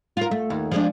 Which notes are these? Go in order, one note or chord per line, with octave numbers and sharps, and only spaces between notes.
F4 A#4
A3
D#2
F3 G#3 D4